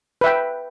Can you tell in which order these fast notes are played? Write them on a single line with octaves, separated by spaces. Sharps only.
B4 E5 G5